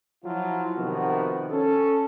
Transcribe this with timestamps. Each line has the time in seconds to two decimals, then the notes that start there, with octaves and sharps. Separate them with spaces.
0.24 F3 F#3 E4 F4
0.77 C3 D#3 F3 B3 F#4
1.51 C#4 A4